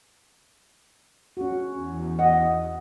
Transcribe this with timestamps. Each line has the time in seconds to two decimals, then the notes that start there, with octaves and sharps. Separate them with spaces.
1.37 C#4 F#4
1.73 E2
2.19 D#5 F#5